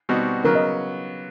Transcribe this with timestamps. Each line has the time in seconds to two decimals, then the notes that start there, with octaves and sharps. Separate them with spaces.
0.09 B2 G3 C4 D#4 F#4
0.44 C#3 F#3 B3 A#4
0.55 D#5